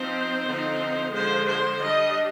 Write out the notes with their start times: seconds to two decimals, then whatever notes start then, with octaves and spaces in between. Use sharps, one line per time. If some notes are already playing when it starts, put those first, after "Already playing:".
Already playing: F3 C4 D#4 C5
0.46 D3 F3 C4 D#4
1.13 D3 F3 G#3 C5
1.46 C5
1.79 G3 D4 D#5